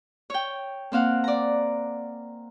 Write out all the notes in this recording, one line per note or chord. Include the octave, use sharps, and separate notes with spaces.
C#5 G5
A#3 C4 F5 F#5
D5 A#5